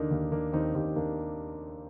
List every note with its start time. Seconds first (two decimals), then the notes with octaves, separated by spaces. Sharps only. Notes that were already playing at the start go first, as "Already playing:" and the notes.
Already playing: D#2 D3 A#3 D4 D#4
0.11 D#2
0.32 D#2 A#3 D4
0.53 D#2 C4 D#4
0.75 D#2 D#4 G4
0.96 D#2 A#3 D4